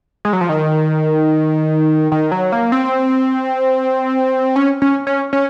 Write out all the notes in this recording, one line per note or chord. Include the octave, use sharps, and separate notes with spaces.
G#3
F#3
F3
D#3
D#3
F#3
A#3
C4
C#4
C#4
C#4
C#4